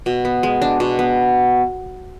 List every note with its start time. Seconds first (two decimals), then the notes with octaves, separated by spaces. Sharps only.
0.06 B2
0.25 B3
0.43 G#3
0.62 D4
0.80 B2
0.99 B3